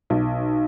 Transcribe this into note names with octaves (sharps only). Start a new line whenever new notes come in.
B1